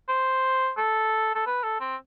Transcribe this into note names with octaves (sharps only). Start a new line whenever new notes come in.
C5
A4
A4
B4
A4
C4